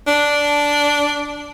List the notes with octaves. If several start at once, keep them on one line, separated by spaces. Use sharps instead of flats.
D4